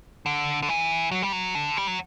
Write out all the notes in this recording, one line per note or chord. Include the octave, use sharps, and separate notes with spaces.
D3
D3
E3
F#3
G3
F#3
D3
G3
F#3